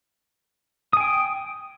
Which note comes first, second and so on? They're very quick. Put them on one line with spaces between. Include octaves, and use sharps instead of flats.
D#6 G#5 G5